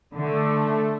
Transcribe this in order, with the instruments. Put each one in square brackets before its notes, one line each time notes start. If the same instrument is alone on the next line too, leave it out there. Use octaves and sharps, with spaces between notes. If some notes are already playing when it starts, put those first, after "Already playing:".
[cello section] D3 [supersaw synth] A3